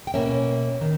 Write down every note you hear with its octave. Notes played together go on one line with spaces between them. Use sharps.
G5
B2 A#3 C#4 E5
D#3